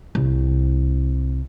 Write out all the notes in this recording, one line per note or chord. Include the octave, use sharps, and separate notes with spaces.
C2